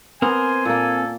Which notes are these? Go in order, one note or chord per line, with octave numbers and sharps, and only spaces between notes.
B3 C4 A#4 C5 G#5
A#2 A#3 A4